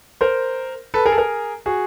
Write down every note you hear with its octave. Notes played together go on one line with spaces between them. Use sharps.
A#4 C5
A4 B4
G#4 A#4
A4
G#4 A#4
F#4 G#4